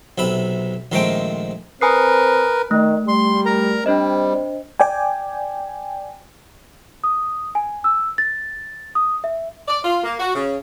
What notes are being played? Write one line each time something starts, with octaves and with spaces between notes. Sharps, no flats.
B1 C3 E5 B5
A#1 D#3 G#3 A3 C4 G5
C4 A#4 B4 G#5 D#6 C7
D#3 A3
G3 C6
A#4 A#5
G3 C4 D4 C5 D#5
D5 G5 G#5
D#6
G#5
E6
A6
D#6
E5
D5
F4
A#3
F#4
C#3